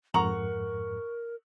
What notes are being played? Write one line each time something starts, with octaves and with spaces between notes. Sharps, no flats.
F2 G#2 A#4 F#5 A#5 C#6 F#7